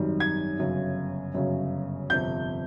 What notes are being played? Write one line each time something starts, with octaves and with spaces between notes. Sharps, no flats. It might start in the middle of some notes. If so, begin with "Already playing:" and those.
Already playing: G#1 F#2 D#3 G3
G#6
G1 F#2 C#3
G1 F#2 C#3
G1 F2 C3 G6